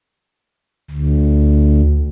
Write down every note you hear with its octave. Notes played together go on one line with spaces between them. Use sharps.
D2